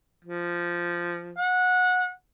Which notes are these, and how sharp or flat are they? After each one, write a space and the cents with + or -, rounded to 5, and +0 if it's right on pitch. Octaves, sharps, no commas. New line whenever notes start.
F3 -10
F#5 -20